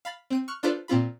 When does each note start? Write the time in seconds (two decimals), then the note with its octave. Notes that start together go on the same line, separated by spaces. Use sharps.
0.05 F5 B5 A6
0.30 C4 G6 D#7
0.48 C#6 F6 F#6
0.63 D4 F4 A4 B4 C5 D5
0.88 A#2 C4 F4 B5